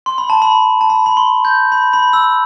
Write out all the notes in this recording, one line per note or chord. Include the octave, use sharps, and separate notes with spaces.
C6
B5
A5
B5
A5
B5
B5
C6
G6
B5
B5
E6